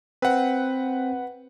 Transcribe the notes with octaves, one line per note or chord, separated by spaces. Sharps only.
C4 B4 F#5